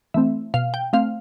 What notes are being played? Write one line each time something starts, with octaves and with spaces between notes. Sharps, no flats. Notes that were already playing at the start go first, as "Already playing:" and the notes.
E3 A3 C4 E5
B2 F5
G5
A3 C4 F5